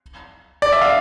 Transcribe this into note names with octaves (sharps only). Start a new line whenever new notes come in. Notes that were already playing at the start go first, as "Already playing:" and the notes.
D5
E5
F5